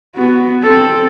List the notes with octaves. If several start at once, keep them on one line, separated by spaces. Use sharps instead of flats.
B3 F#4
C4 A4